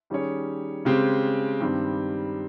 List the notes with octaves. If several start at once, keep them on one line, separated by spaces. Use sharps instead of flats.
D#3 G3 C#4 G#4 C#5
C#3 G#3 C4 G4
G2 D#3 G3 C4